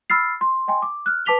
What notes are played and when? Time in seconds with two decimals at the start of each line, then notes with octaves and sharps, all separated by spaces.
0.10 B5 E6 F6 A6 C7
0.41 C6
0.68 D#5 G5 G#5 C6
0.82 D6
1.06 F6 F#6
1.26 B4 A5 D6 B6 F7 G7